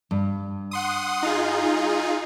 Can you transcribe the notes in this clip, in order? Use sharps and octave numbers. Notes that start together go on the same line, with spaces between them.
G2
F#5 C6 D#6
D#4 F4 G#4